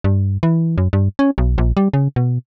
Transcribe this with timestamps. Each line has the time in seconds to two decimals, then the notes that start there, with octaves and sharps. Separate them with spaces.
0.04 G2
0.43 E3
0.78 F#2
0.93 G2
1.19 C#4
1.38 B1
1.58 A#1
1.77 G3
1.94 C#3
2.16 B2